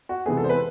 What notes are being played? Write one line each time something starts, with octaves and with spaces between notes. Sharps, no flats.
F#4
C3 E3 G#3 B3 G#4
A4
C5
B4